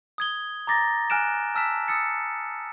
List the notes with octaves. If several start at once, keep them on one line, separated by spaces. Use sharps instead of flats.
D#6 G#6 G7
A#5 D6 A6 A#6
G#5 F6 F#6 D7 E7
A5 E6 F6 B6 E7
D#6 E6 A6 C#7